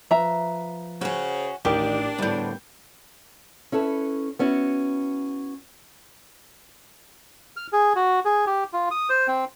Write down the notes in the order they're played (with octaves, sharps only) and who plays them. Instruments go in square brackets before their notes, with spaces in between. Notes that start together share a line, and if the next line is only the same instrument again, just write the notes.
[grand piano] F3 B4 [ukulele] E5 A#5
[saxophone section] C#3 C5 [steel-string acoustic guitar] C#4 F#4
[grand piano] A1 D6 [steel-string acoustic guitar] D#3 [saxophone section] D4 [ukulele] G4 A#4
[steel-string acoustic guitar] D2 A2 [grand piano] G3 B3 G6
[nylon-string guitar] C#4 E4 A4 B4
B3 C#4 E4 F#4
[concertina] F6
G#4
F#4
G#4
G4
F4
D#6
C5
C4